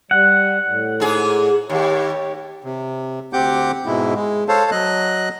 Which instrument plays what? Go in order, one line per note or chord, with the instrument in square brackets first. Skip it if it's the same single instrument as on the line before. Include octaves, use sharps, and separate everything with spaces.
[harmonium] G3 [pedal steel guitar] F#5
[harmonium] A2
[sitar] G#2 G#4
[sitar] D#2 [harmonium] G4 C#5
[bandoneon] C3
D2 C4 G4 F#5 D6 G6
G#2 B2 G#3 E4
G#3
A4 C5 C#5 F5 A5
F#3 D#5 F#6